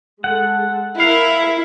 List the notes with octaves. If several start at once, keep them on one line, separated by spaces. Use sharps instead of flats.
G#3 A4 F#5
E4 A#4 E5 F5